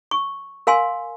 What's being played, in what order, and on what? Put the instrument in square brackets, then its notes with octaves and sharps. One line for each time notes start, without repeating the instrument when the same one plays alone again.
[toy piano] C#6
A#4 F5 G#5 C6